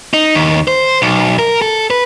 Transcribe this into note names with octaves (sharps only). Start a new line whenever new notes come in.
D#4
D#2
C5
B1
A#4
A4
B4